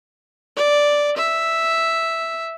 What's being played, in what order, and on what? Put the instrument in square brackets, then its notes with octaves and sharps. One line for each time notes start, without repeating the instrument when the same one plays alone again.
[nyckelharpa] D5
E5